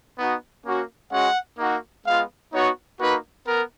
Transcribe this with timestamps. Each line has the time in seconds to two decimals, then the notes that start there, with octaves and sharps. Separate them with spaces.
0.16 B3 D#4 F#4
0.64 A#3 C#4 F#4
1.10 G#3 C#4 F#4 F#5
1.58 A#3 D#4 F#4
2.04 G#3 B3 F4 F5
2.52 B3 D#4 F#4 C#5
2.98 A#3 D#4 F#4 B4
3.46 B3 A#4